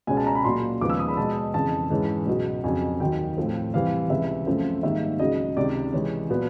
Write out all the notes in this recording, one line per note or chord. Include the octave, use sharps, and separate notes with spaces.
C#2 B2 G#3 C#4 G#5
A5
A#5
B5
A#2 F#3 A#3 C6
D#2 C#3 F3 G#3 B3 D6
E6
D#6
B5
B2 G#3 B3 A5
F2 C#3 E3 A5
G#2 E3 G#3 C#4
C#2 B2 F#3
F2 C#3 F#3 G#5
D#2 D#3 F#3 G5
A2 F3 A3 C4
C3 E3 G3 C4 F5
C#2 C3 E3 E5
F#2 C#3 F3 A3 C4
G#2 D#3 G3 A#3 E5
C#2 C#3 F#3 D#5
C#2 C3 D#3 D5
C3 E3 G#3 C#5
A#2 F#3 B3